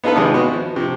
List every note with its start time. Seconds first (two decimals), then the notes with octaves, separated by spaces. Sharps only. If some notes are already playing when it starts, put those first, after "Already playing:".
0.04 B3 D#4 F4 A4 B4
0.16 G#1 C3 G#3 D#6
0.34 B3 F#4
0.53 F3
0.76 C3 F3